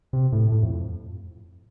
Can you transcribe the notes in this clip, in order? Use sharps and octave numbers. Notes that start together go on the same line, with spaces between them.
C3
A2
A2
F2